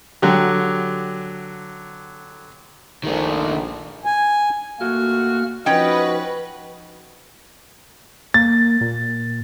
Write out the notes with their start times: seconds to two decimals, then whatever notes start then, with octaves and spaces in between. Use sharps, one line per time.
0.22 D3 F#3 G4
3.04 A#1 D#3 A3
4.05 G#5
4.80 A#2 A3 A#3 F#4 F6
5.66 F3 C#4 D#4 F#4 B4 D#5 G5
8.34 A#3 A6
8.81 A#2